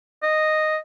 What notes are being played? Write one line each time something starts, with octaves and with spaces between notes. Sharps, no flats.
D#5